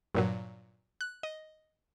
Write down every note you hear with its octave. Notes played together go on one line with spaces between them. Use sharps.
G2 A#2 F#3
F#6
D#5